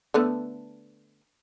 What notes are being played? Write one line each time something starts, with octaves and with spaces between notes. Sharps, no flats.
D3 A3 B3